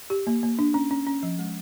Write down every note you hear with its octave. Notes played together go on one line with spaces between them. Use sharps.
G4
A#3
A#3
D4
C#4
C#4
C#4
F3
G#3